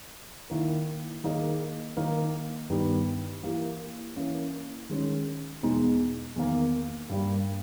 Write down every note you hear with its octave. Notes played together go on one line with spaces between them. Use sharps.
D#3 A#3 E4 A#4
D#3 A#3 D#4 G#4 D#5
D#3 A#3 D#4 A#4
G2 D#3 G3 B3 D#4
E3 A#3 E4 G4
E3 A#3 C#4
D#3 G#3 C#4 G#4
E2 B2 G#3 D#4
E2 D#3 A#3
G2 G3 A#3